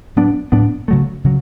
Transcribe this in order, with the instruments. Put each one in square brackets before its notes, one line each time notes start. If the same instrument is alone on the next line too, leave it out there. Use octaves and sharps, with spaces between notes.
[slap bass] A2 F#3 B3 D4
A2 F#3 B3 D4
C#3 F#3 A3
C#3 F#3